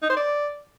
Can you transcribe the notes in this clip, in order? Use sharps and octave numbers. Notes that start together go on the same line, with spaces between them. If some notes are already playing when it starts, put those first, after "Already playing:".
D#4
C5
D5